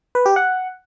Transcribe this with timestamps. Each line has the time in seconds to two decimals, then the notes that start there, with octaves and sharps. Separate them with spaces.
0.15 B4
0.26 G4
0.36 F#5